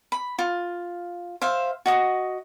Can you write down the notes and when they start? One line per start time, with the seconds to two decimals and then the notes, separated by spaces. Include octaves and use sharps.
0.12 B5
0.39 F4
1.42 C5 E5 F5
1.86 F#4 D#5 D#6